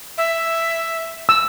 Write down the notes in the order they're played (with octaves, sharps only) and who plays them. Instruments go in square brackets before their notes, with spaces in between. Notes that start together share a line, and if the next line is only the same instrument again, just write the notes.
[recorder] E5
[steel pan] E6